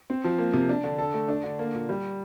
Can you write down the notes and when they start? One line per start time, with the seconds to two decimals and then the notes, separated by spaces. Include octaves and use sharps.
0.10 C4
0.24 F3
0.38 A#3
0.53 C3
0.69 D4
0.84 D3
0.98 A4
1.14 A3
1.28 D4
1.44 D3
1.59 A#3
1.74 A#2
1.89 G3